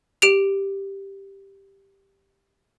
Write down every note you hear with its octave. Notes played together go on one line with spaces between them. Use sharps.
G4 D7 F7